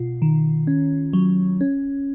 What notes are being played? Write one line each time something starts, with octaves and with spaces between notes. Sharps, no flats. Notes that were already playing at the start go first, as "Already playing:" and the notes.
Already playing: B2 F4
D#3
C#4
F#3
C#4